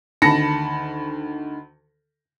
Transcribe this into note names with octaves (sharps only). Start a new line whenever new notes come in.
D2 D#3 A5 B5 A#6 C#7